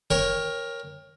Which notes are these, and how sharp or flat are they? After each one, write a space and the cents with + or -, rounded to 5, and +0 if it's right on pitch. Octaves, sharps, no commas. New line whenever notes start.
A#4 +10 C#5 -10 G5 +25